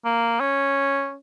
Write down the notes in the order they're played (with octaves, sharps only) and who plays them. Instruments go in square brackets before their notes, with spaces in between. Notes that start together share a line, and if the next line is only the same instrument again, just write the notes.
[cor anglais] A#3
C#4